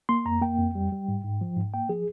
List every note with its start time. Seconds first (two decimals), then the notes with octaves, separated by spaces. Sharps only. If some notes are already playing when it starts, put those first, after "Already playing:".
0.09 A#3 C6
0.25 F2 A#5
0.42 A#3 G5
0.58 F2
0.75 G3
0.92 G3
1.08 G#2
1.24 G#2
1.41 F3
1.57 G#2
1.74 A#3 G5
1.89 F3 G#4